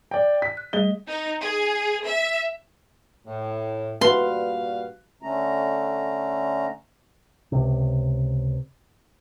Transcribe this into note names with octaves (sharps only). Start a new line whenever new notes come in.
D5 G5
B6
F#6
G3 A3 G#4 D#5 G7
D#4
G#4
E5
A2
G2 A#2 F#4 B4 F5 C6
D3 A3 C#4 A#5
C#2 C3